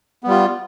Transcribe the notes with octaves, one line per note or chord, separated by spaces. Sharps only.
G3 B3 F4